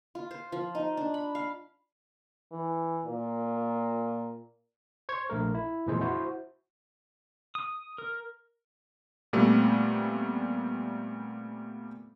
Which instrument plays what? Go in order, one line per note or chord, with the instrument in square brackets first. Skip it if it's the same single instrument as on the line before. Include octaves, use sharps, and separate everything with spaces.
[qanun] F4
C5
F3
D#4
D4
B5
F5
[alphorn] E3
A#2
[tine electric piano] C5 C#6 G#6
A#1 A3 A#4
E4
F2 A#2 E3 G#3 G#4 C5
E4 F#4 C5
[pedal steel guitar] D#6
A#4
[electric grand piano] A#2 G3 A3 B3 C4